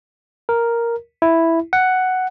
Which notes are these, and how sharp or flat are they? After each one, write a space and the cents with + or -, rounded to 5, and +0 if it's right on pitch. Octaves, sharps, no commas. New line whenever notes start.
A#4 +0
E4 +0
F#5 +5